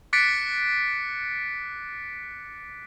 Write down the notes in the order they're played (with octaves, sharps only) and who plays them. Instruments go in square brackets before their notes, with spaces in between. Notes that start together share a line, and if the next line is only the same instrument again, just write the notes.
[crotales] D6 F#6 A6 B6 C#7 D7